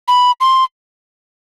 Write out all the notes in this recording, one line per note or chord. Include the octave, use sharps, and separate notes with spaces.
B5
C6